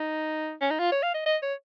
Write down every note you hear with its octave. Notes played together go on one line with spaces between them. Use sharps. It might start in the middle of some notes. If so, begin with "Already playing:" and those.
Already playing: D#4
C#4
D#4
F4
C#5
F5
D#5
D#5
C#5